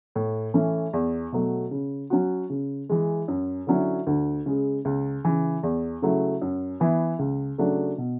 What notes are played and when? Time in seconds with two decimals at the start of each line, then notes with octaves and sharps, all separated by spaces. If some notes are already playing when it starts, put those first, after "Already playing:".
0.16 A2
0.54 E3 A3 C#4 E4
0.93 E2
1.32 B2 F#3 A3
1.71 C#3
2.10 F#3 C#4 F#4
2.50 C#3
2.89 E3 G#3
3.28 F#2
3.67 D3 F#3 C#4 E4
4.07 D2
4.46 C#3 G#3
4.85 C#2
5.25 C#3 E3
5.63 E2
6.02 C#3 F#3 A3 E4
6.41 F#2
6.80 E3 B3 E4
7.19 C#2
7.58 C#3 F#3 A3 D4
7.98 B2